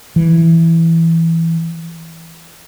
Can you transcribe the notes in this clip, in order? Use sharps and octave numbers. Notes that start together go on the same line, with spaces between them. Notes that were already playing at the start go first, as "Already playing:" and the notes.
E3